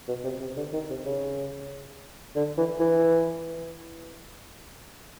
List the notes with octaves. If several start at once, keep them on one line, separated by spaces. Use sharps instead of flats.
B2
C3
C3
D3
D#3
C3
C#3
D3
E3
E3